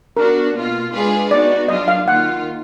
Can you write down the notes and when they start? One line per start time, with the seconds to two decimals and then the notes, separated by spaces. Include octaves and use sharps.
0.17 B3 D4 F#4 A#4
0.56 B2 A#3 F4
0.93 G#3 D4 F4 G#4 B4
1.31 B3 D#4 F#4 D5
1.68 F#3 D4 F4 D#5
1.88 F5
2.06 D#3 A#3 F4 F#5